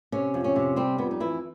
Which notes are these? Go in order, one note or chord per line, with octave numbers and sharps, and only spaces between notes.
C3 C#4
F2
C#4
C3
G3 C4
F2 B3
D#4
E3 E4